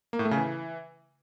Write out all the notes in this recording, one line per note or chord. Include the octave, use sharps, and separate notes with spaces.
A#3
A2
A3
C#3
E3